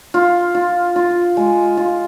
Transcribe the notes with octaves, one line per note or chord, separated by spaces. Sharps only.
F4
F4
F4
G#3
F4